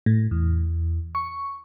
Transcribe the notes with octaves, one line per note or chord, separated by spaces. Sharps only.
A2
E2
C#6